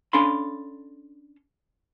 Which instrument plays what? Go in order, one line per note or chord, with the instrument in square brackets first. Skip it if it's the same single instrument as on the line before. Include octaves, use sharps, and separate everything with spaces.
[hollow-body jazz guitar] C#4 D4 A4 F5 B5 C6